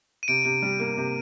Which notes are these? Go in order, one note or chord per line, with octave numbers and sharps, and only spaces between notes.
D#7
C3 D7
C3
G3
A#3
C3